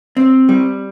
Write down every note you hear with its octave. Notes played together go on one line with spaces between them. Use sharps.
C4
G3